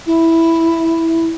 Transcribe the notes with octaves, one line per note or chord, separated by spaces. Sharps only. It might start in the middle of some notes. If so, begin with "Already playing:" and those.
E4